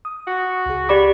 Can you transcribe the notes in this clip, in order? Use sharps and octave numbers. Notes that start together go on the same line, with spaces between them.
D#6
F#4
C#2 G#4
G4 D5 B5 D6